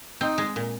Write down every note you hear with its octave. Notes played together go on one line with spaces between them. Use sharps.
C4 D#4
G#3
A#2